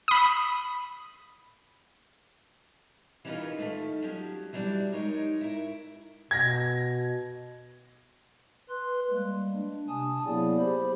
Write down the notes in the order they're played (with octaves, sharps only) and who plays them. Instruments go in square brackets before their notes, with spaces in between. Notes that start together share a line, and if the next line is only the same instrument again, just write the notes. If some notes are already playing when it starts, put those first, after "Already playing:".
[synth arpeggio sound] B5 D#6
[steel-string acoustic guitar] E3 C#4 D#4 F4 A#4 B4
D#3 F3 A3
F3 F#3 C#4 G4
E3 F#3 G3 C4 D4 E4
G#3 D#4 A#4 C#5
E4 A#4
[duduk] B2 [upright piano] G#6 A#6
[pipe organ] B4 C6 F#6
G3 G#3 A#3
D4
C3 G#5 A5 D#6
F#3 A#3 B3 E4 G#4 D5
G4 C5 B5